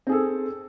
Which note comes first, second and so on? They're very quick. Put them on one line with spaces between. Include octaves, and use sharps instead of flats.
C4 G#4 A4